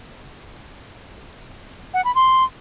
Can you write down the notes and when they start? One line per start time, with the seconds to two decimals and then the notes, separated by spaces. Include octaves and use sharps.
1.94 F#5
2.05 B5
2.15 C6